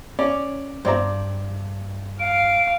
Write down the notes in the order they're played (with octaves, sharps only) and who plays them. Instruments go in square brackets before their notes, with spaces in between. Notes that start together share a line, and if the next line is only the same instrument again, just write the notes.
[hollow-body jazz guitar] C#4 [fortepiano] D5
[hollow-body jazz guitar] G2 [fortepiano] C5 D5 A#5
[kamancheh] F5 [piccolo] D7